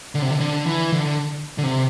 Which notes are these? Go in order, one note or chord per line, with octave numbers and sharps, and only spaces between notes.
D3
C3
D3
D3
E3
D3
D3
C3